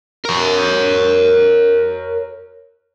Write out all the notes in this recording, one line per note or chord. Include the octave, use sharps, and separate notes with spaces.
A#4 C#5